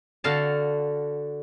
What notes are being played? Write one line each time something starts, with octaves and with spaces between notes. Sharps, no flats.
D3 F#4 F5 A5